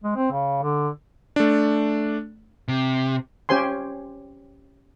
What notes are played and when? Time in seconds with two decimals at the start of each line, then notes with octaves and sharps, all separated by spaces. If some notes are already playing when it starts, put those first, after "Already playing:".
0.04 G#3
0.16 C4
0.32 C#3
0.62 D3
1.36 A3 D4
2.68 C3
3.49 C#4 G4 C5 G#5 C6